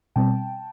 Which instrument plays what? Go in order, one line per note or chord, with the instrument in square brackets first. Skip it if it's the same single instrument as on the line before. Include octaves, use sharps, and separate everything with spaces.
[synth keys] B2 G3 C4 G5 A5